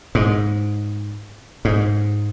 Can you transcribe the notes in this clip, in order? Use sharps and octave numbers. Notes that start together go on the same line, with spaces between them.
G#2
G#2